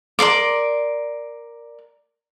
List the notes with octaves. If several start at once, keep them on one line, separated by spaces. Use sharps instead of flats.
A#4 D5 C6 D6